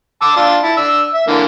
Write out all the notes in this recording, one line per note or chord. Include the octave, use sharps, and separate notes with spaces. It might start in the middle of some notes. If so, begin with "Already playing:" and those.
A5 D6 E6
D4 F4 A5
E4 A5
D4 E6
E5
D3 E3 A#3